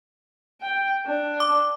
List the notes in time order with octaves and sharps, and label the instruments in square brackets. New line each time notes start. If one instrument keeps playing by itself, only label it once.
[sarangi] G5
D4
[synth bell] D6